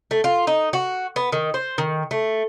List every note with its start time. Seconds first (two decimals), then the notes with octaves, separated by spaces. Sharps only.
0.11 A3
0.24 F4
0.47 D#4
0.73 F#4
1.16 B3
1.32 D#3
1.54 C5
1.78 D#3
2.11 A3